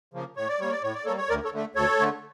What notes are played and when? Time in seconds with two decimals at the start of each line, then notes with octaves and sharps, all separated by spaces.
0.14 C#3 F3 A#3
0.37 A2 C#5
0.48 D5
0.60 G3 A#3 C#5
0.71 D5
0.83 A2 C#5
0.94 D5
1.05 G3 A#3 A4 C#5
1.18 C#5
1.29 D2 A#4 D5
1.45 A4 C#5
1.53 D3 A3
1.75 D2 A4 C#5
1.99 D3 A3